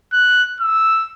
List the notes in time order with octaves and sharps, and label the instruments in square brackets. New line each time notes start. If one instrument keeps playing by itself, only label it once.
[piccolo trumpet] F#6
E6